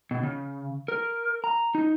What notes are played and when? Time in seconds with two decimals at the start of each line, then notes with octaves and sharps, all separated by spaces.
0.11 B2
0.23 C#3
0.88 A#4
1.44 A#5
1.75 D#4